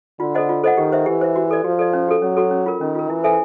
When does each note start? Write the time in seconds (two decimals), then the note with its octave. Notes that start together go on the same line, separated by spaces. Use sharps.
0.20 D3 F4
0.34 A4 C5 D#5 F#5
0.49 F4
0.64 A4 C5 D#5 F#5
0.77 D#3 G4
0.92 C5 E5
1.06 E3 G4
1.21 C5 E5
1.36 F#4
1.51 A4 D5
1.64 F3 F#4
1.79 A4 D5
1.93 C#4
2.08 F#4 A4
2.22 F#3 C#4
2.37 F#4 A4
2.51 C#4
2.66 F4 A#4
2.80 D#3 C#4
2.95 F4 A#4
3.10 E3 E4
3.24 A4 C5 E5 G#5